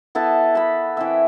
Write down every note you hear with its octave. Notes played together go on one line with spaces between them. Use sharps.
B3 E4 A4 A5
A5 B5
E3 C4 E5